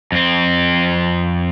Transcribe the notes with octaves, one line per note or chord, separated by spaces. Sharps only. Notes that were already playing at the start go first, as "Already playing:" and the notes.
F2 C4